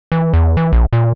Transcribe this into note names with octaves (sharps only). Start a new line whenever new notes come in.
E3
E2
E3
A#1
A#2